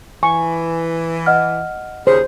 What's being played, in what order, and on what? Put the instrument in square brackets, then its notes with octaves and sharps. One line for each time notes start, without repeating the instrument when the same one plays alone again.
[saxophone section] E3 [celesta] G#5 [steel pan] C#6
[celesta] D#5 F#5 F6
[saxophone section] D#2 C#3 G#4 [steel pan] C5